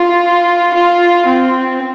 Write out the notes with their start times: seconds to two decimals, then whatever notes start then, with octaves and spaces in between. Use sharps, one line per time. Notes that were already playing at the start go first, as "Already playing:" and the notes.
Already playing: F4
0.74 F4
1.26 C4